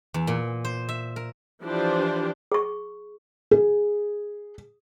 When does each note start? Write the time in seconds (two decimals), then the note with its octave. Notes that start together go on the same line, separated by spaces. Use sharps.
0.14 E2
0.27 A#2
0.65 C5
0.89 E5
1.16 A#4
1.64 E3 F3 D4 G4 C5
2.52 G#4 C#6
3.51 G#4